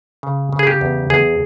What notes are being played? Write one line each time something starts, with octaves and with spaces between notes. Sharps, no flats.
C#3
C#3
G#4
G4
E2
E2 G#4